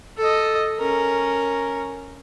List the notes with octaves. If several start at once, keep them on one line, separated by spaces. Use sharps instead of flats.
A4 D#5
C#4 A#4